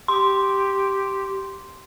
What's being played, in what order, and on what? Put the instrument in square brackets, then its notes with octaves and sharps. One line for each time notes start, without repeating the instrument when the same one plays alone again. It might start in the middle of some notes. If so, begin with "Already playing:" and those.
[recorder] G4 [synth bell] C6